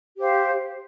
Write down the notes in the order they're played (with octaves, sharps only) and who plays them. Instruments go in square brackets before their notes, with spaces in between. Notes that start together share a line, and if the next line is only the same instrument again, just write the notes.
[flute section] G4 C5 F5